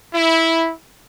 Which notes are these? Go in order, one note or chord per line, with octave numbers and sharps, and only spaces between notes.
E4